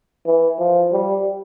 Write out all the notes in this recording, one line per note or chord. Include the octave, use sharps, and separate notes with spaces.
E3
F3
G3